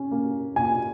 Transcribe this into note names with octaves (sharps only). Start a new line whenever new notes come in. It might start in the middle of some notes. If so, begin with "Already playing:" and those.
Already playing: C#4
A#3
A#2 G#5